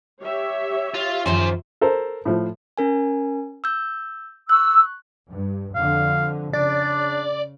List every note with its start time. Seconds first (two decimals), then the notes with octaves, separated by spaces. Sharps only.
0.23 G4 C#5 E5
0.94 F4
1.26 F#2 D#3 F3 G#4 C5
1.81 A4 A#4 C5
2.25 A2 F3
2.78 C#4 A#4 G#5
3.64 E6 G6
4.49 C#6 E6 F#6
5.29 G2
5.75 F2 D3 F5
6.53 C#3 D4 D5